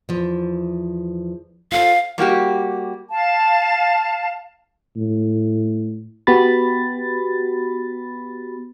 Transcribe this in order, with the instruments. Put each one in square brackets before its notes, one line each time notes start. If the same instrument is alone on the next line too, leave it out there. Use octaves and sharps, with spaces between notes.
[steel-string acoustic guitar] E2 F3
[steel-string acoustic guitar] F4 A4 C5 [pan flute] F5
[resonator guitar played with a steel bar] G3 A#3 F#4 G4
[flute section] F5 A5
[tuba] A2
[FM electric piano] B3 F#4 G4 B5 A6